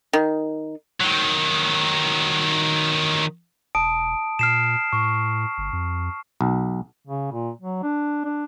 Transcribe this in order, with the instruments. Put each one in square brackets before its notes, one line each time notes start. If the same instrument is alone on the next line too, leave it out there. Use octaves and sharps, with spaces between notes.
[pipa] D#3
[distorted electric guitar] D#3 F#3
[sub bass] E1 [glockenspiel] A5 D#6 D7
[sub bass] A#2 [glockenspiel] F6 C7 E7
[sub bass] A2 [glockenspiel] C#6
[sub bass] G1
F2
[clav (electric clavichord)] B1
[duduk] C#3
A#2
F#3
D4
D4